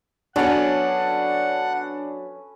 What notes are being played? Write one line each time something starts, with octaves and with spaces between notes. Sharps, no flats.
F#3 B3 C#4 D4 F#4 A4 B4 F#5